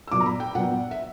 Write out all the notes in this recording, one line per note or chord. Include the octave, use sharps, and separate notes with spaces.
E6
A#2 F#3 B3 D4 D6
A#5
B5
G5
A#2 F#3 B3 D4 F#5
E5